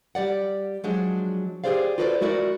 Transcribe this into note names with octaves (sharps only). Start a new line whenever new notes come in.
G3 G4 D5 F#5
F3 F#3 G#3 D4
G4 G#4 A#4 C5 D5 F5
F4 F#4 A4 B4 C5 D5
G#3 A3 E4 F#4 A#4 D5